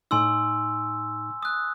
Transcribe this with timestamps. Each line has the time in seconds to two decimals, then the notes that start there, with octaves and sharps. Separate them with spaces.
0.11 A2 D#4 G#5 C6 E6
1.43 D#6 F#6